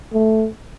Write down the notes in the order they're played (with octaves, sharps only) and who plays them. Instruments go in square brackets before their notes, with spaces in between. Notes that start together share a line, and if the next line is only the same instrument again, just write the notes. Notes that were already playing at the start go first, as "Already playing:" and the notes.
[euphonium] A3